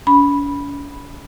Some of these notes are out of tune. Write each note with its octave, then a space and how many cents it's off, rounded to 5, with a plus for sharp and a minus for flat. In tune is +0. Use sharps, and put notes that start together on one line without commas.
C#4 +45 B5 -5